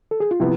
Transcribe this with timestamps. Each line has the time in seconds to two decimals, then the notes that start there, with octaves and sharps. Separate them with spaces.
0.11 A4
0.20 G#4
0.31 F4
0.40 C3 F3 B3 E4